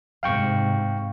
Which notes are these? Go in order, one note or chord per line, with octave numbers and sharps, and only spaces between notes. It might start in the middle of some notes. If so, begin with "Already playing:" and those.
G#2 C3 F5 G5 C#6